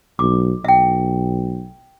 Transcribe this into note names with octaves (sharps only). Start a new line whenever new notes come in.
B1 D6
B1 E5 G5